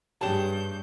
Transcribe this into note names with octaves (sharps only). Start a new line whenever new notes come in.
G2 G3 G#4 C#5 A5 G6 E7